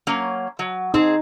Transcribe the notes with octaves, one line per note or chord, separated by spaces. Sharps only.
F#3 A#3 C#4
F#3
C4 D#4 G#4